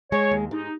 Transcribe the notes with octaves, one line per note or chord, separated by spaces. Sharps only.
G#3 C#5
D#2
G#2 D#4